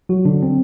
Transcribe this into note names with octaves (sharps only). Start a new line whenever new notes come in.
F#3 F#4
D3 D4
C4